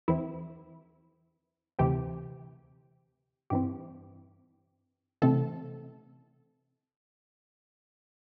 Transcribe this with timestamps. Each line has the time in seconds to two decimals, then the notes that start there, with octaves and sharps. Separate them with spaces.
0.08 E2 E3 C4 E4
1.79 D2 C3 E3 C4 G4
3.50 G2 E3 C4 G4
5.22 C3 E3 A3 C4 A4